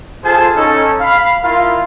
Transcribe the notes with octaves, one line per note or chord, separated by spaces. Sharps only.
F4 G#4 A4 C5 G#5 A5
C#4 D#4 A4
F5 B5
E4 F4 A#4 F5